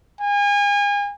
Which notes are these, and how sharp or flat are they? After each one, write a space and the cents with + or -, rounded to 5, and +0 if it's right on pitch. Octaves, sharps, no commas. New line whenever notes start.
G#5 -35